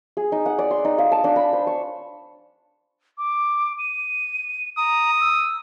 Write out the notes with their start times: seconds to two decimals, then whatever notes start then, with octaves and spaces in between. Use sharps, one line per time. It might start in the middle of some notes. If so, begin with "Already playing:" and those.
0.17 G#4
0.32 D#4
0.46 F#5
0.59 D5
0.71 C6
0.85 D#4
0.98 F5
1.12 A5
1.24 D4
1.36 B5
1.53 C5
1.67 C#6
3.18 D6
3.79 D#7
4.77 A#5 D#6
5.21 E6